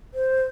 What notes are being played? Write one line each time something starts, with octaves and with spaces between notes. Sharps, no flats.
C5